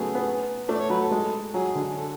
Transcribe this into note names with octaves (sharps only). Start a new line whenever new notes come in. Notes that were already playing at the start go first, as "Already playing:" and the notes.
Already playing: C#3 F#3 A3 B3 G#4
B3
A3 D4
D5
C#5
F#3 B4
A4
G#3
F#3 G#4
D3
A4